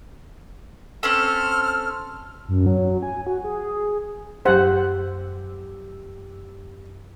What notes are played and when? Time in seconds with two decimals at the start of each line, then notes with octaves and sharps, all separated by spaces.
1.03 C4 C#4 A4 F6
2.48 F#2
2.66 F#3
3.02 G#5
3.27 F#4
3.44 G#4
4.45 F#2 G4 C5 F#5 E6